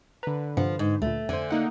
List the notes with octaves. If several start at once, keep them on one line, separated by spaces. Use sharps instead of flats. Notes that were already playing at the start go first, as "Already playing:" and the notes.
D3 B4 A#5
G2 C3 F3 F#5
G#2
D2 A#2 A3
F2 D3 C5 G#5
A#3 D#4 F#5